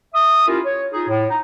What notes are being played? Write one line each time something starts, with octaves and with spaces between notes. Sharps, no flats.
E5 D#6
C#4 E4 F4 G4 A#4
C#5
D#4 F4 G#4
A2
D#4